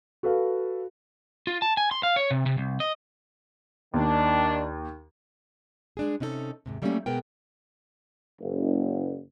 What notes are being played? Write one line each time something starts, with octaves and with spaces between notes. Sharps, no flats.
F#4 A4 B4 F5
F4
A5
G#5
C6
F5
C#5
C3
C3
C2
D#5
D#2 D#3 D4
G#3 D4 G#4
C3 C#4 D#4 E4 A4
D#2 G#2 C3
F#3 G3 A3 A#3 C4 C#4
B2 G#3 B3 A#4 G5
F#1